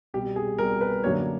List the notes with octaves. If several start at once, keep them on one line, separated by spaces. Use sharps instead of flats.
C2 B2 G3 G4
G#4
C2 B2 G3 A#4
B4
F#2 D3 F#3 A#3 D4 C#5